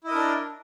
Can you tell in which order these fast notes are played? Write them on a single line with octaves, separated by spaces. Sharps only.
E4 D#5 A#4 D4